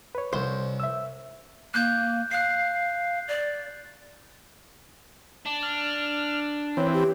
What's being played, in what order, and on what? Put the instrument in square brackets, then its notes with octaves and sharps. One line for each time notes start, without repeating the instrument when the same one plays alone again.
[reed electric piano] B4 C#5
[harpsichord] C2 [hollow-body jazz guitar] C5
[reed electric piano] E5 E6
[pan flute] A#3 [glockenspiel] F#6 G6
[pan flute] F5 [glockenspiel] F#6 C7
[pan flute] D5
[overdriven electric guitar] D4
[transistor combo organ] F6
[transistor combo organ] E3 C4 [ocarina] C#5
[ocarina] G4